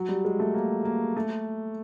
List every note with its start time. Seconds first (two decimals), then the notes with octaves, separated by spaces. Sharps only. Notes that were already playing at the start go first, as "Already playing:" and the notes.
Already playing: F#3
0.09 G3
0.25 G#3
0.40 A3
0.54 A#3
0.85 A#3
1.16 A3